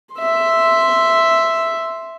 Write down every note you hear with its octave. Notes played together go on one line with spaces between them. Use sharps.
E5 C6